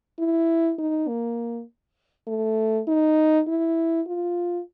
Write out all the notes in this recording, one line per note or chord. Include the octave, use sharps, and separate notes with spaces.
E4
D#4
A#3
A3
D#4
E4
F4